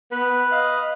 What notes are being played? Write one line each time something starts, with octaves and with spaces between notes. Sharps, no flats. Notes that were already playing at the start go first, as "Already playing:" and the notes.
B3 B4
D#5 F5